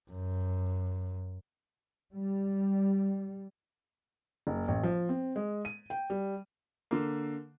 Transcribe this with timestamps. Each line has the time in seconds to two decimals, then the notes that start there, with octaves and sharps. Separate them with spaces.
0.11 F#2
2.14 G3
4.47 F#1
4.68 A1
4.83 F3
5.09 C4
5.36 G#3
5.65 D#7
5.90 G5
6.10 G3
6.91 D3 A#3